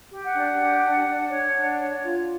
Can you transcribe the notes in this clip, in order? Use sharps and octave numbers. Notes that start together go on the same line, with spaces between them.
G4
F#5
D4
G4
D4
D4
C#5
D4
C#5
F4